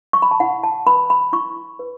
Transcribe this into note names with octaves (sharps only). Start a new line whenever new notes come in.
C#6
B5
A5
E4 F#5
A5
B4 B5
B5
E4 C#6
B4